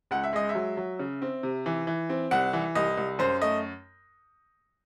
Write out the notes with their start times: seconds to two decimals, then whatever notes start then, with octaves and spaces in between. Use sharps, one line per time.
0.11 C#2 F#5
0.23 E5
0.33 G#3 D#5
0.49 E5
0.55 F#3
0.77 F#3
0.99 C#3
1.22 C4
1.43 C3
1.66 E3
1.87 E3
2.09 C4
2.31 C2 F#5
2.53 E3
2.75 C2 D#5
2.98 C2
3.19 F#2 C5
3.41 A3 D#5